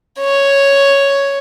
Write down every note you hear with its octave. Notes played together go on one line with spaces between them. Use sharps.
C#5